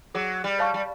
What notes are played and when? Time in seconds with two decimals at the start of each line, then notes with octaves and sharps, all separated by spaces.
0.15 F#3 G#4
0.44 G3
0.59 C#5 F5 A5 C#6
0.74 G3